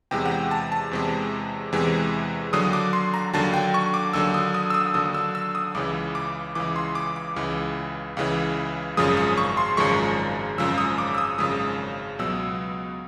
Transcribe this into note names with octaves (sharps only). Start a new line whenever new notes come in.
E2 C3 E3 G#3 G5
F#5
G5
A5
A5
E2 C3 E3 G#3
E2 C3 E3 G#3
D#2 D3 F#3 D#6
D6
C6
A#5
D#2 D3 F#3 A5
G5
C#6
D6
D#2 D3 F#3 E6
D#6
D#6
E6
D#6
D#2 D3 F#3 D#6
E6
E6
D#6
C#2 C#3 E3 D6
D6
C#2 C#3 E3 D6
C6
D6
D6
C#2 C#3 E3
C#2 C#3 E3
G#1 F#2 C#3 F3 G#3 D#6
D#6
C#6
C6
G#1 F#2 C#3 F3 G#3 C#6
G#1 F#2 C#3 F3 G#3 E6
D#6
D6
E6
D#6
G#1 F#2 C#3 F3 G#3 D#6
C#2 B2 F#3 E6